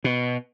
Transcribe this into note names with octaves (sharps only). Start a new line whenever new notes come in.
B2